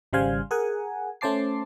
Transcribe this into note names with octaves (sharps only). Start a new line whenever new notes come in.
G#1 C#3 G3 C5 F5 G#5
G#4 A#4 F#5 G#5
A3 C#4 C5 A5 D6 C7